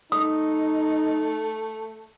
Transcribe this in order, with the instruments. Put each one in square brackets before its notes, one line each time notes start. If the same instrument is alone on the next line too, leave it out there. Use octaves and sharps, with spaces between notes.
[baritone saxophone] A3 [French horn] D#4 [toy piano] D#6